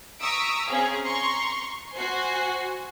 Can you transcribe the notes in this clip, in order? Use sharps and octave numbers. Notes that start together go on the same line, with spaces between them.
A#5 C#6 D#6 E6 B6 D7
C4 C#4 G#4 F5 A#5
A#5 C6 C#6
F#4 C5 G#5 C7